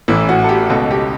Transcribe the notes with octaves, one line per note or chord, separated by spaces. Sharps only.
A1 A2 E3 E4
F#4
A4
G4
C#2 B2 A4
G4